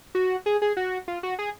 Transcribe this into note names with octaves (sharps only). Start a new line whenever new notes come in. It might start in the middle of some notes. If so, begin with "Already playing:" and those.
F#4
G#4
G#4
F#4
F4
F#4
G#4